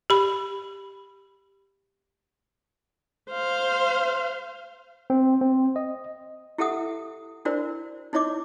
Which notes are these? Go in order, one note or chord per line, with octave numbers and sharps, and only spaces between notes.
G4 B5
C5 F5
C4
C4
D#5
E4 G4 A4 E5 F#5 D#6
D4 E4 F#4 A#4 C5 D5
D#4 E4 C#5 D#5 D6